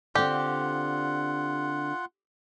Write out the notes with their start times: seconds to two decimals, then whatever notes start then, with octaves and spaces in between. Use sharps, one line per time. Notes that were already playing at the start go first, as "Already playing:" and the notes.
0.15 D3 C4 F4 G4 F#5